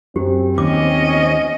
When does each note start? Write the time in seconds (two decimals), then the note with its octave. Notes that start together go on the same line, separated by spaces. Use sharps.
0.16 F#2 C4 G4
0.58 D#2 C#4 D#5 D6